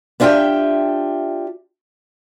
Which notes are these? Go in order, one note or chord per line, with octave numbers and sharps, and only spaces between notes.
B3 D4 F4 G4 E5 G5